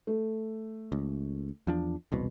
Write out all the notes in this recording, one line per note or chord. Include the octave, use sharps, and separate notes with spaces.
A3
C#2
E2 F3 D4
E1 C2 B2